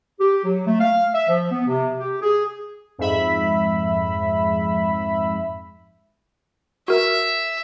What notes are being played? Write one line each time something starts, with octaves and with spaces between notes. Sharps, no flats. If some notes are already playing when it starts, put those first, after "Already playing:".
G4
F#3
A3
F5
E5
F3
B3
C3
G4
G#4
F2 G#2 E5 B5
F#4 A#4 E5